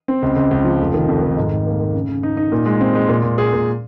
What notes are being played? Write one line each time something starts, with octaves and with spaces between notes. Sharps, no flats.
C4
C#2
C#2
C#2
F3
F1
D#3
F2
D#3
G#2
G#2
A#3
A#3
C#3
C#3
D#4
D#4
A#2
G#3
C4
G#3
A#2
A#2
G#4
A#2